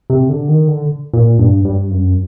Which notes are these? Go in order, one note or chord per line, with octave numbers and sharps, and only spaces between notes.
C3
D3
D#3
D3
A#2
G2
G2
F#2